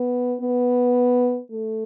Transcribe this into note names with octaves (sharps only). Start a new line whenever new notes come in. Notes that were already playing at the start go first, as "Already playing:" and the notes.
Already playing: B3
B3
A3